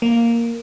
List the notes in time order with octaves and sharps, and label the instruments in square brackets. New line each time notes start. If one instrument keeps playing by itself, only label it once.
[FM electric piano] A#3